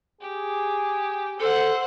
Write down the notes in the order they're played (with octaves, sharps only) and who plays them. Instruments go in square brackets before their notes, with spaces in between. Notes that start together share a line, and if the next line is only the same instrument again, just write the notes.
[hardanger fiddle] G4 [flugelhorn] G#4
[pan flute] A4 [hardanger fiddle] C5 F#5